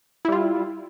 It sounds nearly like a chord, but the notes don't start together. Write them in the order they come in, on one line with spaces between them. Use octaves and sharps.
E4 G3 F4